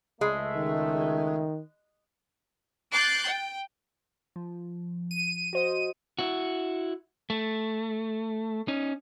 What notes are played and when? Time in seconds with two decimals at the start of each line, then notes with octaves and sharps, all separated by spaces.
0.21 C#2 G#3 A3 E5
0.57 D#3
2.93 D6 F#6 G6 A6 C7
3.27 G5
4.36 F3
5.11 D#7
5.53 F#4 C5 D#5
6.19 E4 F#4
7.30 A3
8.68 C#4 D#4